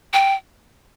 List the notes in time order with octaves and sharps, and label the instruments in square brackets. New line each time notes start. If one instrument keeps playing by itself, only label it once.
[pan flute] G5